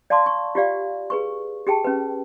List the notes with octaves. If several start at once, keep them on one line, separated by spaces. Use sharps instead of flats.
D5 F5 A5 C6 D6
C#6
F4 G4 D5 F5
G#4 B4 C#6
G4 G#4 G5 A5
C#4 B4